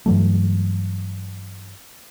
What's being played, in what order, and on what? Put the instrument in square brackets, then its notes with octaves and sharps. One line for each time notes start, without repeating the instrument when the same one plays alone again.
[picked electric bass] G2 E3 F#3 A3